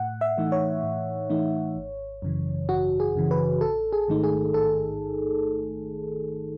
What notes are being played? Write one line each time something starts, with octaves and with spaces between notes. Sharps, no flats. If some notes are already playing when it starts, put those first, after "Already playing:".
Already playing: A2 F#5
E5
E3 A3 D#4
C#5
A2
E3 A3 D#4
G#1
F#2 C#3 E3
G#1 F#4
G#4
F#2 C#3 E3
B4
A1 A4
G#4
G#2 D#3 A3 D#4
G#4
A1 A4